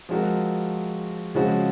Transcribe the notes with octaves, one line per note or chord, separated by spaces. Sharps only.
F3 G#3 C4 F#4 A#4
C#3 F3 G#3 C4 F#4